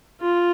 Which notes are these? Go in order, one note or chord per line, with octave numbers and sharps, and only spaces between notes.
F4